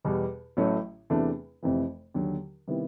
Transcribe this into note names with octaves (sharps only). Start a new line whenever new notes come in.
E2 B2 G3
A1 A2 F#3 A3 C#4
E2 C3 E3 A3 D4
F1 F2 C3 E3
D#2 D3 F#3
C3 D#3 G3 B3 E4